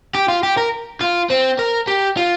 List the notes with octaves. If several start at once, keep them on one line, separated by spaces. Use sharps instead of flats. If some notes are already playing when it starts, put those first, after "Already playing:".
G4
F4
G4
A#4
F4
C4
A#4
G4
F4